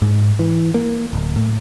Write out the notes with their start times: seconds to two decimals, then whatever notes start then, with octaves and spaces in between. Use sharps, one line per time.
0.02 G#2
0.39 E3
0.74 A#3
1.13 D1
1.36 A2